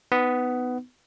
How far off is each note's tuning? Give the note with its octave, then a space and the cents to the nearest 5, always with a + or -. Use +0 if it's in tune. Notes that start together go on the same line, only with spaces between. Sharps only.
B3 +15 D#4 +0